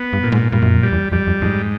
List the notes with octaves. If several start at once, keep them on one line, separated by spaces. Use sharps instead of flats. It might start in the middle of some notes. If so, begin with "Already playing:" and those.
Already playing: B3
G2
A#2
G#2
G2 A#2
F#2
F2
G3
E2
F2 G3
F2
F2 G#2